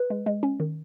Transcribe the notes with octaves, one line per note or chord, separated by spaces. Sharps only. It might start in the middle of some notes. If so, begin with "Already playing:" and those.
Already playing: B4
G#3
G#3
C#4
D#3